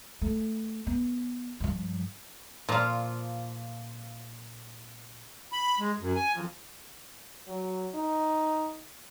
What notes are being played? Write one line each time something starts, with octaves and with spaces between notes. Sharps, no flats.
A3
B3
G2 F3
A#2 F3 F4 F5
B5
G#3
F#2
G#5
F2
F#3
D#4